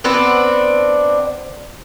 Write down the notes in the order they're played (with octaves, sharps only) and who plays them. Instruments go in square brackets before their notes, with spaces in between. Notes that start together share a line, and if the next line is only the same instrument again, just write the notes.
[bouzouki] B3 C4 D4 B4